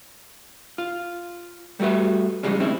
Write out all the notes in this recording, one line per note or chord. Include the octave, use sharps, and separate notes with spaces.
F4
G3 A3 F#4 B4 E5
A2 C#3 F3 G3 G#3 C#4
A2 D#3 C4 C#4 E4